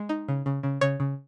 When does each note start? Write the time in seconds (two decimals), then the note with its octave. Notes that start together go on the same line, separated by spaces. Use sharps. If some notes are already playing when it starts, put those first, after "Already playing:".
Already playing: G#3
0.09 D#4
0.28 C#3
0.46 C#3
0.63 C#3
0.81 C#3 C#5
1.00 C#3